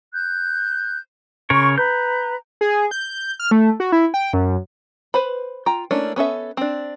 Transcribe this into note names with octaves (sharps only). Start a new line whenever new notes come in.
F#6 G6
C#3 A#4 C#5 C6 C#6
B4 A#5 G6
G#4
G6
F6
A3
F#4
E4
G5
F#2
B4 C5 B5
F4 G5 A#5
A3 A#3 C#4 D4 E4
B3 C#4 A4 E5
C4 D4